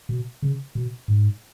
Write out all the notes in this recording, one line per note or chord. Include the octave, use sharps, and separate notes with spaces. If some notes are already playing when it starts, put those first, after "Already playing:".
B2
C#3
B2
G#2